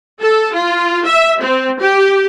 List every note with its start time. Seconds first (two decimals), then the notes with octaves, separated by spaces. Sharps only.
0.21 A4
0.54 F4
1.05 E5
1.41 C4
1.80 G4